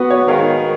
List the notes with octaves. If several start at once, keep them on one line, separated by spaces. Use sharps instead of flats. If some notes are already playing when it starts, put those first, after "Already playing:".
Already playing: B3 F#4 B4
C#5
D#3 G#3 F5